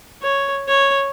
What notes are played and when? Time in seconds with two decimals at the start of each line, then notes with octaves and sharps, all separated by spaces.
0.22 C#5
0.68 C#5